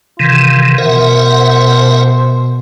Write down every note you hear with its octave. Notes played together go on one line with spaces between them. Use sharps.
C3 D#3 E3 F4
B2 A#4 C5 E5 F#5